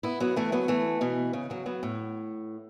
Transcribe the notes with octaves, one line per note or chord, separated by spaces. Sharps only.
B3 E4
F#3 B3
E3 A3
F#3 B3
E3 A3
B2 E3
C#3
C#3 F#3
F#3 B3
A2